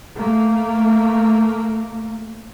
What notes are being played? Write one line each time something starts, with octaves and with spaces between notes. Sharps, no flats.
A3 A#3